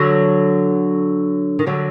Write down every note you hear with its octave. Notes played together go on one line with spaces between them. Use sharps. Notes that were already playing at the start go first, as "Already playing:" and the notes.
Already playing: D3 F#3
D#3
D3 F#3